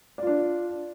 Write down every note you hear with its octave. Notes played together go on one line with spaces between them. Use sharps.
D4 F4 D5